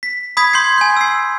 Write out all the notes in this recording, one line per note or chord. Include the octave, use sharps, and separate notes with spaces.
B6
B5 D#6 G#6 B6
C6 G6 G#6 C7
G#5 G6
E6 C7